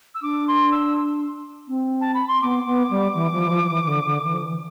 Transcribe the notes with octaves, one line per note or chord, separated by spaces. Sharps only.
E6
D4 D6
C6
E6
C4
A5
B5
C6
B3 D6
B3
G3
E3
F3
E3
F3
F3
E3
E3
D3
D3
E3
F3
E3